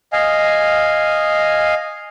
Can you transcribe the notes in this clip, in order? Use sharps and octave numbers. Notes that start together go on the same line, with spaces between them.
D#5 F5 G#5